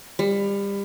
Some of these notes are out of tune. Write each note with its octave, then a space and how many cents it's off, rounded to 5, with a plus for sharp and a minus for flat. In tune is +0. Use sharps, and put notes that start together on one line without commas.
G3 +30